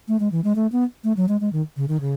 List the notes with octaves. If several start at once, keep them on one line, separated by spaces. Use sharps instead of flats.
A3
G#3
E3
G#3
A3
B3
A3
F#3
G#3
G#3
D#3
C#3
D#3
C#3